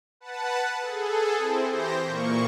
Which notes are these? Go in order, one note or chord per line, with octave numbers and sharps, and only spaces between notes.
B4 F#5 A5
G#4 A4
C4 E4 C5
E3 G4 C5 G6 A#6
A#2 A#3 C#6